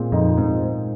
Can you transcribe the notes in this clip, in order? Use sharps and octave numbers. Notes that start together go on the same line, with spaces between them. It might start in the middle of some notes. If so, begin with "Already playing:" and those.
Already playing: A#2 G#3 C4
F2 D#4
G#2 C4